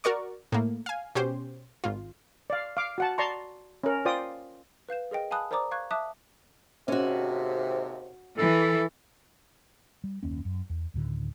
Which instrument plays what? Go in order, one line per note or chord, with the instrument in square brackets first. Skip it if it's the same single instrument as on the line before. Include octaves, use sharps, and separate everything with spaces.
[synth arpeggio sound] F#4 A#4 D5 C#6
A2 A#3
F5 G#5
B2 C#4 G4 C5
G#1 F4
[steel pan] D5 F5
F5 D6
F#4 F#5 A5
D5 A5 A#5 C6 C#6
C#4 A#4
F4 C5 D5 G5 D#6
[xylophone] B4 F5 G6 E7
G#4 A#4 D#5 G5
F5 G#5 A5 B5 D#6 F#6
A#4 C5 D5 A#5 D6 D#6
F5 C#6 F#6 G#6
E5 A5 D6 D#6 F#6
[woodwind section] D#2 G#2 C3 [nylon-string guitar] C#4 F#4
[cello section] E3 [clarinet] A4
[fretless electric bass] G3
F#1 D#2 A#3 C#4
F#2
E2
D2 A2 D3 D#3